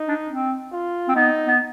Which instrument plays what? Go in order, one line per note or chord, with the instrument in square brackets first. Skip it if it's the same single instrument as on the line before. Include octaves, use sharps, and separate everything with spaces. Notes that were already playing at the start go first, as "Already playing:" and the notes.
Already playing: [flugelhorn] D#4
[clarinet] D4
C4
[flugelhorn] F4
[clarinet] C4
[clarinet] B3 [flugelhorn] D#4
[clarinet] B3